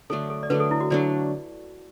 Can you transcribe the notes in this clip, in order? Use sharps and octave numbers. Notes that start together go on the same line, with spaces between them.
D3 F#3 A3 D4 A4
A4
D5
D3 F#3 A3 D4 B4
A4
E4
F#4
D3 F#3 A3 D4 D5